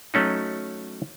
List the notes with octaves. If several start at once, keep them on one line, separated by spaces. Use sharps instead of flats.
F#3 A3 C#4 D#4